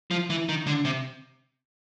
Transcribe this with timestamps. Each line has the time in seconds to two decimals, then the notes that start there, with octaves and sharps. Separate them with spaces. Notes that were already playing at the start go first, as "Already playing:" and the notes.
0.11 F3
0.30 E3
0.49 D#3
0.66 D3
0.85 C3